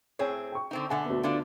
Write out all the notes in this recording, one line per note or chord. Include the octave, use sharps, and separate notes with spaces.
A2 C4 G#4 C#5
G5 C#6
D3 C4 D#4
B2 D3 A3 F#5 G#5
D2 B3
D3 D4 F4